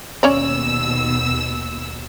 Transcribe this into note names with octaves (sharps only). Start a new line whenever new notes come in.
D#2 B2 C#4 C#5 D5 E6